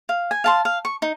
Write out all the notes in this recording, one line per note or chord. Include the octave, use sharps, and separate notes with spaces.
F5
G#5
F5 A5 C6
F5
C#6
D#4